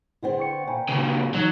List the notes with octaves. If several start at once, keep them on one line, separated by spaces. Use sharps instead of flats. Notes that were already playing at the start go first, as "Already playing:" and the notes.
D3 B3 C4 E4 G#4
G5 C#6 C#7
A#2 G5 G#5 B5
A#2 C#3 B4
E3 F#3 D#4 D#5